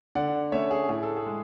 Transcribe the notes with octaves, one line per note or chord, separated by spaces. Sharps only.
D3 D5 F#5
A3 C#4 C#5 E5
G#4
A2 G#4
A4
G#4
G#3